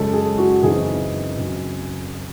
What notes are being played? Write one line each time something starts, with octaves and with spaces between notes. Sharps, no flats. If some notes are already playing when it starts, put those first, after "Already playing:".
Already playing: F#2 C#3 G#3 C#4 A4
G#4
F#4
F#2 C#3 E3 C4 D#4 G#4
F#2 C#3 F#3 C4